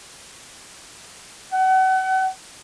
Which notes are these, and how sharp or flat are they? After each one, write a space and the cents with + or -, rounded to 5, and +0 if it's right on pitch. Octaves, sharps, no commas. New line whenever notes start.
F#5 +35